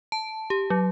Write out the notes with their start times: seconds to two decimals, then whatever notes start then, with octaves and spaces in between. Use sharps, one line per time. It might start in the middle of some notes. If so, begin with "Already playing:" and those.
0.12 A5
0.50 G4
0.70 F#3